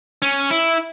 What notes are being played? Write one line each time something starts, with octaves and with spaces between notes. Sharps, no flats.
C#4
E4